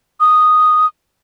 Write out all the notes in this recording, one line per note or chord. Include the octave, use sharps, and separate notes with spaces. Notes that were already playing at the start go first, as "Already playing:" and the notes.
D#6